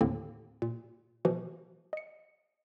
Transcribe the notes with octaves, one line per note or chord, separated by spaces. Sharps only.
D#2 A2 D3 A#3 C4
A#2
B2 E3 F3
D#5 C#7